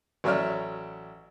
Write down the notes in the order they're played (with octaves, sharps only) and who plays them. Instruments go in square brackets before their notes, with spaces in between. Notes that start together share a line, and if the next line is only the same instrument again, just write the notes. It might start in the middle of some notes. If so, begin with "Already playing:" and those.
[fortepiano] A1 F#3 C#5 D5 E5 F6